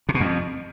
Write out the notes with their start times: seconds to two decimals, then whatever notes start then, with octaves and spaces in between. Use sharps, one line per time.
0.09 C3
0.15 B2
0.20 F2